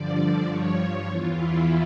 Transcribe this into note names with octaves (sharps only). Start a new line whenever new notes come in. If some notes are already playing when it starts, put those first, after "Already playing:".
Already playing: G2 D3 F3 D5
D5
G2 F3 C#5
E2 E3 F4
E4